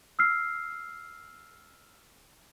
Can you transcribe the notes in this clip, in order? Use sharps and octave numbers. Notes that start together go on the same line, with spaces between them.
E6 F6 C7